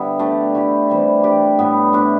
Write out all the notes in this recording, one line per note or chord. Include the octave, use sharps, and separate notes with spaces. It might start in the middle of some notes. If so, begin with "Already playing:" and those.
Already playing: D3 G3 B3 E4
A3 D4 G4 D5
A3 E4 G4
E3 G3 C4
G3 D4 G4 D5
A2 G3 B3 E4
A3 D4 G4